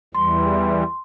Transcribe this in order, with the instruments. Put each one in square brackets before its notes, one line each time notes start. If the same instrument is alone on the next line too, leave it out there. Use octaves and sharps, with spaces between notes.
[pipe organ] E2 E3 G3 [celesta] C6